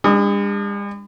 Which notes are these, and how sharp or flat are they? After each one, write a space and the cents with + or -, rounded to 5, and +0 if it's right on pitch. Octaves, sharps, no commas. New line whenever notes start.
G#3 -45 D4 +0 D#6 +10